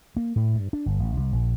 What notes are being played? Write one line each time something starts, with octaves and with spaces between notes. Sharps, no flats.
A#3
A2
G2
D4
G1
A1
C2
A#1